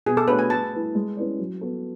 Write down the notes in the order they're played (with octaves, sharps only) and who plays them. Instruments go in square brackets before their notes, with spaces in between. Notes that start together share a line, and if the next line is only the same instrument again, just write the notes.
[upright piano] B2 [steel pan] G#4
[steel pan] A4
[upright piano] A3 D4 F#4 C#5 [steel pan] B4
[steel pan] G#5
[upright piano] A3 [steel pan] A5
[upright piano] E4 B4
G#3
C#4 E4 B4 D5
F#3
B3 F#4 A4